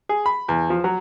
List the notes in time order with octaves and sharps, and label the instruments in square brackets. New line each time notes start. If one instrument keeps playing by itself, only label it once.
[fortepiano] G#4
B5
E2
F3
F#3